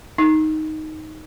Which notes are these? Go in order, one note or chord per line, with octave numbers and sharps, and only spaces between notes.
D#4